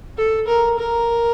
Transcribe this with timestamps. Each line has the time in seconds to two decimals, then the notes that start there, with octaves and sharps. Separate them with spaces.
0.17 A4
0.47 A#4
0.78 A#4